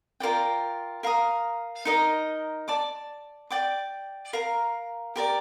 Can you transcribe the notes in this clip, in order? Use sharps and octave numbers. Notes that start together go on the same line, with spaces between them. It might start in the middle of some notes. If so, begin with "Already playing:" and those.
F4 A#4 D5 G5
A#4 F5 A#5 D#6
D#4 A#4 D#5
D5 A5 D6
D5 G5 D6
A#4 F5 A#5
G4 A#4 D5